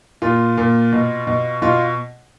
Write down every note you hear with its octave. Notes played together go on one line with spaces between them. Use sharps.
A#2 F4
A#2
B2
B2
B2 F4